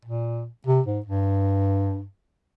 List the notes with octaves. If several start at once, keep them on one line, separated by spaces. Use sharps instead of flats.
A#2
C3
G#2
G2